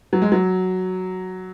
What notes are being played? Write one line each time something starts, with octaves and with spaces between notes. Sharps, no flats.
F#3
G#3
F#3